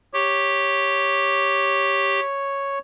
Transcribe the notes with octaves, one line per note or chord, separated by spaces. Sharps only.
G4 C#5